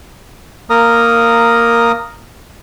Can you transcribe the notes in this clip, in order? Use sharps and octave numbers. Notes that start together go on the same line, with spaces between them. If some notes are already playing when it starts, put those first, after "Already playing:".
A#3 A#4 A#5 D#6